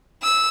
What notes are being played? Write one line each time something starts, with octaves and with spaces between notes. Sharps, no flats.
E6